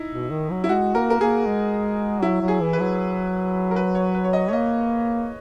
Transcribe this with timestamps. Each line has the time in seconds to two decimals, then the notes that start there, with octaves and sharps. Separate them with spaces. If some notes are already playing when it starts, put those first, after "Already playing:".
Already playing: D#4 E4
0.12 B2
0.31 D#3
0.50 F#3
0.64 E4
0.69 G#3 F#4
0.95 A#3 A#4
1.10 A#4
1.20 A#3 G#4
1.46 G#3
2.22 F#3 E4
2.42 F#3
2.48 G#4
2.61 E3
2.73 B4
2.80 F#3
3.71 A#4
3.76 B4
3.95 C#5
4.15 B4
4.24 C#5
4.33 D#5
4.48 C#5
4.52 A#3 D#5